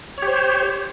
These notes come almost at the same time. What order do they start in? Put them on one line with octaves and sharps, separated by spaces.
C#5 G4 C5